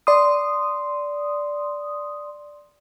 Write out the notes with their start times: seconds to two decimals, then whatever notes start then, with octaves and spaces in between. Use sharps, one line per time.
0.07 D5 C6 D#6